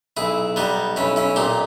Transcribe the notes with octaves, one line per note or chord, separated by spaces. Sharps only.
B1 E4 G#4
G3 B3 D#4
B1 C#4 E4
C#4 E4
A#2 D#4 G4